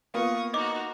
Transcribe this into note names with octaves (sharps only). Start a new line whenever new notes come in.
A#3 B3 F4 C#6 D#6
D#4 F#4 D#5 D6